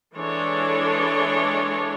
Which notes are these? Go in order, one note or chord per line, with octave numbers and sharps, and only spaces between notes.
E3 G#3 D4 A4 C#5